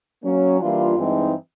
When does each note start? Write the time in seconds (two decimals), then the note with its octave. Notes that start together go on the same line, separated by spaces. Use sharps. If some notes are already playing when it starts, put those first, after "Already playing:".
0.23 F#3 A#3 C#4
0.60 E3 G3 A#3 D4 F4
0.96 G2 E3 G#3 C4 D#4